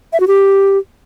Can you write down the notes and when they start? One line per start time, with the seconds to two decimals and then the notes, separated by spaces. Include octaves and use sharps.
0.13 E5
0.20 F#4
0.28 G4